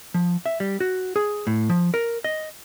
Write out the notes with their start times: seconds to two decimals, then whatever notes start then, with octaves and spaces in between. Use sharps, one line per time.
0.14 F3
0.46 E5
0.60 G3
0.80 F#4
1.16 G#4
1.47 A2
1.70 F3
1.94 A#4
2.24 D#5